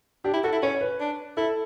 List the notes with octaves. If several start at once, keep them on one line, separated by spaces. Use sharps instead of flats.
D4 G4
E4
F#4 A4
E4
C#4 C#5
B4
D4
E4 A4